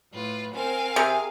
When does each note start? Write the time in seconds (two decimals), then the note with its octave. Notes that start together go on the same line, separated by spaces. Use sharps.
0.12 A2 F4 B4
0.54 C4 A#4 F5 G#5
0.96 C3 G#4